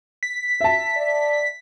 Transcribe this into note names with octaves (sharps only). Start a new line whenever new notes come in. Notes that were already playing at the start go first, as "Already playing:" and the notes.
B6
E5 A5
D5